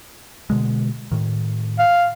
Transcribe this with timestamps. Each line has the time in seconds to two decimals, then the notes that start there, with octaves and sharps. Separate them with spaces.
0.50 B2 D3 G#3
1.11 A2 D#3
1.79 F5